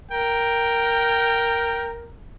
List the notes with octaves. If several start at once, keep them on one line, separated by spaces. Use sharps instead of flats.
A#4 G5